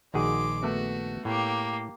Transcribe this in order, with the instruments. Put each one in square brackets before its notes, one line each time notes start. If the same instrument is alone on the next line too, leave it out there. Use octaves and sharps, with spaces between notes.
[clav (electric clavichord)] A#1 D#3 G#4 [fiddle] G#3 D6 [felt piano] D#4 F#4
[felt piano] A3 B3 [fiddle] F#4
[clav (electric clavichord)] A2 [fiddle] A#3 G4